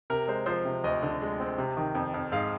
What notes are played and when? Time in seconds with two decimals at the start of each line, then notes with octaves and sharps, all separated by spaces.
0.10 C3 A#4
0.28 G#3 C5
0.46 F3 C5
0.65 C3
0.84 D2 D#5
1.03 D3
1.21 G#3
1.40 C4
1.58 C3
1.77 D#3
1.95 F2
2.14 F2
2.32 G#2 F5